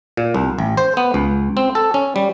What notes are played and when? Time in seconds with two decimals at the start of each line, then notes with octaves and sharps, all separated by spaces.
0.17 A#2
0.34 C2
0.59 A1
0.77 C5
0.97 B3
1.14 C#2
1.57 C4
1.75 A4
1.94 C#4
2.16 G3